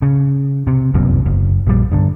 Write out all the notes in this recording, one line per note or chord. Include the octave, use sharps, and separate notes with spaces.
C#3
C3
F1 C2 F#2 B2
F#1
A#1 G3
G2 D3